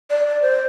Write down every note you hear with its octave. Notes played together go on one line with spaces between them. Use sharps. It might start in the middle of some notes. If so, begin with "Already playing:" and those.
D5
D5
C5